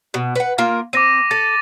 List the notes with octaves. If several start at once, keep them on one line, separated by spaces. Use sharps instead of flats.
B2
B4 F#5
A#3 F4 A#4
C4 D6 A#6 D#7
A4 A6